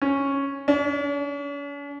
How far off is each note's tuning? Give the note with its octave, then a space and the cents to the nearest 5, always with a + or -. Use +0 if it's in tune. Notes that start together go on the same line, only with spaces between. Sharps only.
C#4 -5
C#4 +45